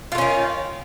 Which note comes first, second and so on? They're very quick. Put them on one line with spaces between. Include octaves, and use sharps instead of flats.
F4 A3 C#4 D#3